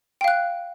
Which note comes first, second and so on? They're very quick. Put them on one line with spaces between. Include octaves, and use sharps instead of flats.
G5 F5 F#6